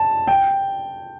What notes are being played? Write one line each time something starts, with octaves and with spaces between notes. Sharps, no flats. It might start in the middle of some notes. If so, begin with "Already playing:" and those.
Already playing: A5
G5